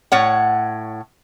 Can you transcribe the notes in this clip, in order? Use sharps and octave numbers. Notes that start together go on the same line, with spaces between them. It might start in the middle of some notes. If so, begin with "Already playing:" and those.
A2 C#5 F#5